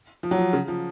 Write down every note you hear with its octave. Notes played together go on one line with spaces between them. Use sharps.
F3
F#3
F3
C#3
F3